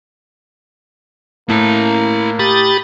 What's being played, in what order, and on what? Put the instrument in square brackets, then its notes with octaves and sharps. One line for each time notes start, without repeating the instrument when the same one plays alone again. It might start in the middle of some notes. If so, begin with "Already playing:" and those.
[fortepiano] A2 [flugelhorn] A#3 [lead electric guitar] E4 A#5
[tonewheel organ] G4 D#6 A6 [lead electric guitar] B5